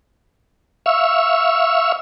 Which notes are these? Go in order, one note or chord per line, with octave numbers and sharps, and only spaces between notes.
E5 F5 C#6 E6